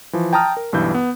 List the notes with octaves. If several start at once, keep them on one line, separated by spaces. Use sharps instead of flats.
E3 F3
G5 A5 A#5 D#6 F6
A#4
B1 G2 E3 G6
B3